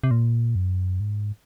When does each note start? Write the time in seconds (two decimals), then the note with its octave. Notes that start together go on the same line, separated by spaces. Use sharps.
0.04 C3
0.11 A#2
0.55 F#2
1.00 G#2